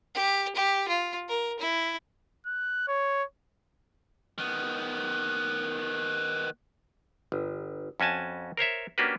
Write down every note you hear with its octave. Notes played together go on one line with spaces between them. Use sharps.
G4
G4
F4
A#4
E4
F#6
C#5
D#3 B3
G1
F2 C#4 F#4 G#5 A5
A#4 C5 C#5 E5
A#3 C#4 D4 F#4 G4 B4